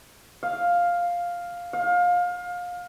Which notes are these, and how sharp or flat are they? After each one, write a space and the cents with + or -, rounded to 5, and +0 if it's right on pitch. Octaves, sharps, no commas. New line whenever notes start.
F5 +5
F5 +25